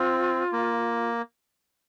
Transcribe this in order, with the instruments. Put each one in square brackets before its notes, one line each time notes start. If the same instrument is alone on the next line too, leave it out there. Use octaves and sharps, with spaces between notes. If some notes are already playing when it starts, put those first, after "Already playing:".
Already playing: [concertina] C4 [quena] F4
[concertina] A#3